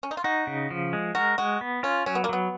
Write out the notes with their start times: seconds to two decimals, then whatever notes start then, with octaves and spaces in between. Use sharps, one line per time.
0.03 C#4
0.11 D#4
0.17 F4
0.24 D#4 F#4
0.47 C#3
0.70 F3
0.93 G#3
1.15 F#4 A#4
1.38 G#3 F#4
1.61 B3
1.83 C#4 F4
2.06 F#3 C#4
2.15 B3
2.24 A#3
2.29 F#3 B3